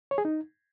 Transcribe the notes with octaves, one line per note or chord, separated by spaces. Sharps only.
C#5
G#4
D#4